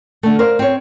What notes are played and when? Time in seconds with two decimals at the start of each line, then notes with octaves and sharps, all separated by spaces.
0.23 D3 A3
0.39 A#4 C5 D5 F5
0.59 C4 C#5